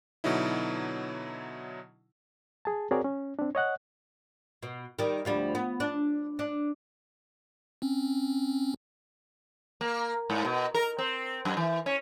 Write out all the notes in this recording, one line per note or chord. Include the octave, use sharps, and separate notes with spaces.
B2 D3 F#3 D#4 E4
G#4 A5
C4 F#4 G#4 A#4 C#5 D5
C#4
C4 D4
C#5 D#5 F#5 F#6
B2
D#3 G3
D2 F3 G3
B3
D4
D4
C4 C#4
A#3
G#2
B2
A#4
C4
F#2
E3
C#4